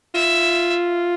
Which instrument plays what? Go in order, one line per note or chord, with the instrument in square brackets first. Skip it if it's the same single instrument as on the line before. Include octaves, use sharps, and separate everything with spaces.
[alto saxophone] F4 [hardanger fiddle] E5